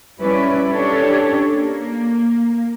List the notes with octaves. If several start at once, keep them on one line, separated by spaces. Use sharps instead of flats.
G3 C#4 E4 B4 D5
C#4 D4 G4 A4 C#5
A#3